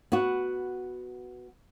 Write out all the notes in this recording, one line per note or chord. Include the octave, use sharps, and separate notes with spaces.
B3 F#4